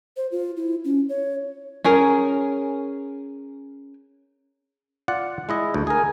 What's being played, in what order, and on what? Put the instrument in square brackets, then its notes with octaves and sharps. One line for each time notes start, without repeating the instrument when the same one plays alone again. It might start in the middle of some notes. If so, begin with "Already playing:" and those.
[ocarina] C5
F4
E4
C#4
C#5
[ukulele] C#4 G#4 A#4
[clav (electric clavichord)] F4 D5 F#5
G#3 E4 D#5
D2
[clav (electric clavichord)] G#4 A#4 [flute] G#5